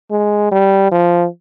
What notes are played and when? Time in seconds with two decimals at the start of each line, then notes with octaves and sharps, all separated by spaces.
0.11 G#3
0.52 G3
0.92 F3